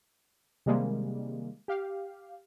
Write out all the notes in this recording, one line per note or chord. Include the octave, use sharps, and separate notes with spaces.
C3 D#3 G3 G#3 A#3
G4 F5